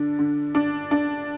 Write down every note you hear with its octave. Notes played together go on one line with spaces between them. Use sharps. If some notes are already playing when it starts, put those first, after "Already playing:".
Already playing: D3 D4
D3
D4
D4